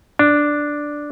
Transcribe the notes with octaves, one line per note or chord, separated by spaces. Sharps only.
D4